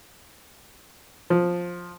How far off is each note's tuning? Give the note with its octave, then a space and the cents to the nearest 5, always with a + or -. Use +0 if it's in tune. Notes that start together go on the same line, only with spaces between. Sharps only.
F3 +10